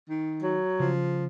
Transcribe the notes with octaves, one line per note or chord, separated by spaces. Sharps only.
D#3
F#3
C#3 F3